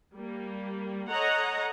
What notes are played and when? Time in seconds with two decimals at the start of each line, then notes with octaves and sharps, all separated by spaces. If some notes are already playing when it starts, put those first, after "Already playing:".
0.14 G3 A#3
1.10 A4 C#5 D#5 F#5 A#5